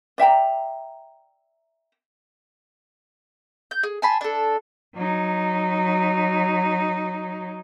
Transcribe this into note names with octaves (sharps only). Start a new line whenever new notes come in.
D5 E5 G5 A#5
G6
G#4
G#5 A5 B5 C6
D4 A4
F#3 D#4